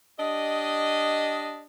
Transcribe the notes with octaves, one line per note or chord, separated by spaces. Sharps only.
D4 G4 D#5